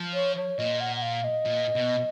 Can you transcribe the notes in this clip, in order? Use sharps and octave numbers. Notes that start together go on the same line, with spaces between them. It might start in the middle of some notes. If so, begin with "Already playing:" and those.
Already playing: F3
C#5
C#5
A#2 D#5
F#5
F#5
F5
D#5
A#2
B2